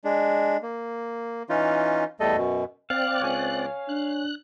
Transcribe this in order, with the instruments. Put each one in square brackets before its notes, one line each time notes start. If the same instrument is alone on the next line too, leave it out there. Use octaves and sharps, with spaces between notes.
[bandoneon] G#3 D4
A#3
E3 C#4 D#4 F4
E2 G3 A3 A4 D#5
F#2 B2
[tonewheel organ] C4 D5 F#6 [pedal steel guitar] F5
[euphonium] C#2 [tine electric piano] C#5 G#5
[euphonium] D4 [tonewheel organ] F#6